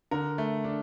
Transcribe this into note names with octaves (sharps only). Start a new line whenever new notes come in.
D3 A#4
A3
D4